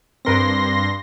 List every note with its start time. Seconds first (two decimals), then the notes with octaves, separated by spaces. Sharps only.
0.25 G2 C4 A#4 B4 C6 A#6